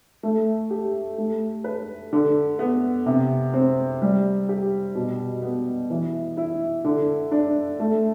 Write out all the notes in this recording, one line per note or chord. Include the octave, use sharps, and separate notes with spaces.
A3
G4
A3
B4
D3
B3
C3
C4
G3
G4
B2
B3
E3
E4
D3
D4
A3